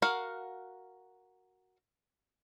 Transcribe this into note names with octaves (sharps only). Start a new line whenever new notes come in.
F#4 A#4 F5 F#5